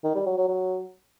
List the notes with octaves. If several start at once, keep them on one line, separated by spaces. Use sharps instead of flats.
D#3
G3
F#3
F#3
F#3